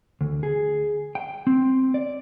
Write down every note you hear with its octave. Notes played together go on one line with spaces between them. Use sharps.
D2
G#4
G5
C4
D5